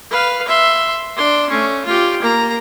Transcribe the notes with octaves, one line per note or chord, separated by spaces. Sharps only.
B4 F5
E5 C6
D4 C6
A3 C#4
F4 G4
A#3 A#5